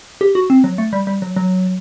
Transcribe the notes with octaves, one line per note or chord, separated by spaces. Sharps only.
G4
F#4
C4
F#3
A3
G3
G3
F#3
F#3